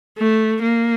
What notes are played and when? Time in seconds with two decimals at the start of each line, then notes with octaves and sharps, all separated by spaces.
0.18 A3
0.62 A#3